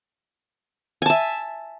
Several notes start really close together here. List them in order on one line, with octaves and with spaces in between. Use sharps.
G#5 A5 E5